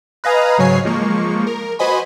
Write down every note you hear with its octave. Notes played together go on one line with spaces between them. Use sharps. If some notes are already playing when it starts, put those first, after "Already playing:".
B4 D#5 F5 G#5 A#5
G#2 C#3 F#3 C#5 G#5 C7
F3 G#3 A#3 C#6
A#4
F#4 B4 C5 D#5 G#5 B5